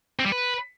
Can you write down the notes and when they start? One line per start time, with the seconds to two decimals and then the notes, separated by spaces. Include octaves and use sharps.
0.19 C4
0.26 G3
0.32 B4